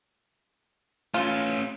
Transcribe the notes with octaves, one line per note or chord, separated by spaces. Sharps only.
A3 C#4 F4